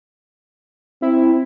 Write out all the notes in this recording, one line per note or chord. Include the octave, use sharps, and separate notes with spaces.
C4 E4